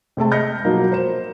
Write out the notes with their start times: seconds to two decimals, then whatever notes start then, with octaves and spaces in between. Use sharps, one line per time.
0.17 C3 G#3 A3 A5
0.31 D#5 B5 F6 G6 A#6 C#7
0.63 B2 F3 F#3 A#3 D#4
0.92 C5 E7